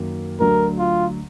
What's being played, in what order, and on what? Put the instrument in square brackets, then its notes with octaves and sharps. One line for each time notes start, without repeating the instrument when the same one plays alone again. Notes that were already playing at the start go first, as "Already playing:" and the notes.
Already playing: [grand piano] F#2 D#3 A#3
[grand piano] D2 D3 F#3 [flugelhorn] A#4
[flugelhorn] F4